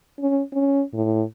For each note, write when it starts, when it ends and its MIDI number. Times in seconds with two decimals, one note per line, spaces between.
0.19 0.42 61
0.53 0.82 61
0.94 1.23 45